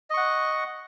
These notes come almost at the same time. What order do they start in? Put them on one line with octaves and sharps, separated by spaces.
D#5 C#6 F#5